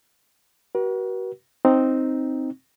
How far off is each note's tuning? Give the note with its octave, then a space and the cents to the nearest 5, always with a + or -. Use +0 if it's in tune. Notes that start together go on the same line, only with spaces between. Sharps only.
F#4 +35 B4 -45
C4 +0 D#4 +0